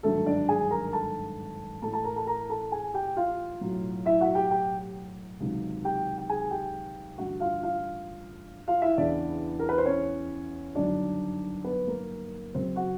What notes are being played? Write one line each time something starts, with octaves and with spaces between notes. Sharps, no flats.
G#1 G2 D3 F#3 A3 A4
D4 D5
G#4 G#5
A#4 A#5
A4 A5
A1 A2 E3 A4 A5
A4 A5
A#4 A#5
A4 A5
A#4 A#5
A4 A5
G#4 G#5
G4 G5
F4 F5
B1 A2 F#3
E4 E5
F#4 F#5
G4 G5
G4 G5
C#2 C3 D#3 F#3
G4 G5
G5
G#4 G#5
G4 G5
A1 G2 D3 F#4 F#5
F4 F5
F4 F5
F4 F5
E4 E5
E2 C#3 E3 D4 D5
A#4
B4
C5
C#4 C#5
G1 F#2 D#3 F#3 D4 D5
B3 B4
A#3 A#4
F#1 F#2 C#3 F#3 C4 C5
F#4 F#5